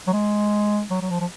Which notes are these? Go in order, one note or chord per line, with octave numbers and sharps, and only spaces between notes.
F#3
G#3
F#3
F#3
F3
F3